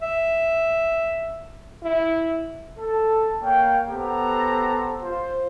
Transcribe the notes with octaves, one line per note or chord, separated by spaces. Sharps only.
E5
E4
A4
A#3 C#5 F5 G5
B3 G4 A4 C5 F#5 A#5
F4 C5